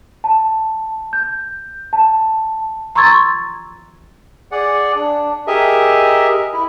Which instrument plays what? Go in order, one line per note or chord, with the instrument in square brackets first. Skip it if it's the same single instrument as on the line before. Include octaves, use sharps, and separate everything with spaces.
[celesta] A5
G6
A5
[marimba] A#5 C6 C#6 E6 G#6 A6
[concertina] G#4 D5 F#5
D4
G4 G#4 A#4 D#5 E5
E4